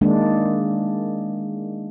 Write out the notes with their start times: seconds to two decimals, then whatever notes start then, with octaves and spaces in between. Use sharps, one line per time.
0.01 D#3 G#3 A#3 D4